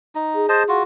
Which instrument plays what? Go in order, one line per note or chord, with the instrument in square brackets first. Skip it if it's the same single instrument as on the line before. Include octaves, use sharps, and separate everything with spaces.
[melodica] D#4
[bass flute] G#4
[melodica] C5 D#5 A5
F4 F#4